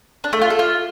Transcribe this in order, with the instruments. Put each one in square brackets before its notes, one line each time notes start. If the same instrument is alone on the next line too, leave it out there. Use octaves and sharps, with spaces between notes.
[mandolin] D4
A3
F4
A4
F4